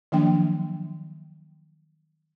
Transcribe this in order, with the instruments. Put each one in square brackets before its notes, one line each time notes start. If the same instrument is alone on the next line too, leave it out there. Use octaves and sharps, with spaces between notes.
[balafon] D#3 F3 F#3 A#3 D4 G5